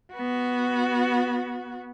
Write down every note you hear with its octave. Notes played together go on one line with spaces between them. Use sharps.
B3 F#4